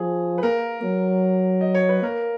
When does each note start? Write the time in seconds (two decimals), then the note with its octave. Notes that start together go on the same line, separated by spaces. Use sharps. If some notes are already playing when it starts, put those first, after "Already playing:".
Already playing: F3 G#4
0.38 B4
0.43 A#3 A#4
0.83 F#3
1.61 D#5
1.74 C#5
1.89 B4
2.02 A#3 A#4